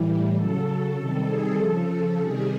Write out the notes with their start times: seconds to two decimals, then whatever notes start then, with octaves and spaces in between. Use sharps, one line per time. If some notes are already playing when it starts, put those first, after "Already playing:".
Already playing: A2 E3 G3
0.34 C#3 F#3 A4
0.96 C3 D#3 G3
1.27 G#4
1.58 C#3 F3 A4
2.19 C3 D#3 G3 G#4